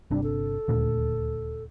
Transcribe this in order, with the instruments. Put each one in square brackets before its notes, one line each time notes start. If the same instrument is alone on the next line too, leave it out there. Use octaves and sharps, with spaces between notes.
[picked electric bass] G1 C3 D4 [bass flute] G3
[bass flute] A4
[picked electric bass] D#1 D2 A#2